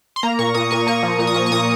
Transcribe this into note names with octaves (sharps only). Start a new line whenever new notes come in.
C6
A#3 A#5
A#2 C#6
A#2 D#6
A#2 C#6
A#3 C#6
F3
A#2 C#6
D#6
F3 C#6
C#6
A#2 D#6